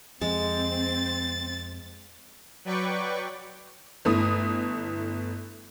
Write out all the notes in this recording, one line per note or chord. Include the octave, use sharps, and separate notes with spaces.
F2 G#3 C4 A6
F#3 B4 D5 G5 C#6 D6
G1 A3 E4 D#6